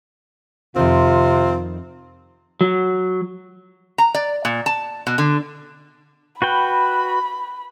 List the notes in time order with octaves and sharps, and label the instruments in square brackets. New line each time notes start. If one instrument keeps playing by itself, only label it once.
[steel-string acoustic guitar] F2 D#3 [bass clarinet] C3 [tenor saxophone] C4 [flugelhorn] F4
[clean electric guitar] F#3
[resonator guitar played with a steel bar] A#5
D5
A#2
A5
B2
D3
[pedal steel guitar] F#4 B4 G5 [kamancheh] B5